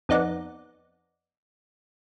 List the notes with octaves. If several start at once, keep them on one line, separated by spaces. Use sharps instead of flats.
F2 B3 D#4 D5 F#5